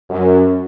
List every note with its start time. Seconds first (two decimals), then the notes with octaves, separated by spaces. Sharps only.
0.10 F#2